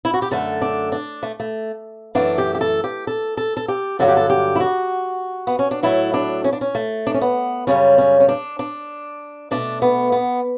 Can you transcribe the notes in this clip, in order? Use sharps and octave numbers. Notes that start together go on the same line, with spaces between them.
E4
F#4
G4
F#2 D3 A3 A4
D4
D4
A3
A3
F#2 E3 A3 D4
G4
G4
A4
G4
A4
A4
A4
G4
G2 D3 F#3 A4
G4
A4
G4
E4
F#4
B3
C#4
D4
A2 F#3 A3 E4
D4
C#4
D4
C#4
A3
D4
C#4
B3
F#2 C#3 G3 C#4
C#4
C#4
D4
D4
B2 A3 D4
B3
B3